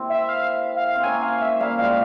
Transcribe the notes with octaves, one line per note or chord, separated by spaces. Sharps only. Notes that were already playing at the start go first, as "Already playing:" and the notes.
Already playing: A#3 C4 E4 G4
E5
F5
F5
C4
A#3 C#4 G#5
F5
E5
G3 A#3 F5
F3 G#3 F5